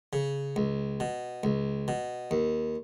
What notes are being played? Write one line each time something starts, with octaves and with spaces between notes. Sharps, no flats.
C#3
C#2
B2
C#2
B2
D#2